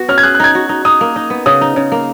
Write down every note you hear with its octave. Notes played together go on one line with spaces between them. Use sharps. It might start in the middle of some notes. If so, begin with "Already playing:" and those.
Already playing: B3 F#4
C#4 F6
G#6
G#4 F#6
F#6
D#4 G#6
F#4
D#4
D#4 D#6
A#3
D#4
B3
C#3 D#6
D#4
C#3
A#3